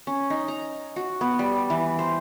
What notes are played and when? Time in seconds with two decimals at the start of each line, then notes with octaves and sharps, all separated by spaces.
0.07 C#4
0.30 D#4
0.48 A#5
0.96 F#4
1.21 B3
1.39 G3
1.70 E3
1.99 C5